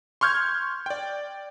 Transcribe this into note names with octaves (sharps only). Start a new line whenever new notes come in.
C6 C#6 F6 G6 G#6
D5 G5